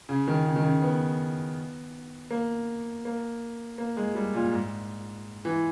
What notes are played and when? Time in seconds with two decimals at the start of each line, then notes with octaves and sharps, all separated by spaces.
0.09 C#3
0.28 D#3
0.46 C#3
0.56 D#3
0.64 C#3
0.82 B3
2.31 A#3
3.05 A#3
3.78 A#3
3.97 G#3
4.15 G3
4.35 A#2
4.52 G#2
5.45 E3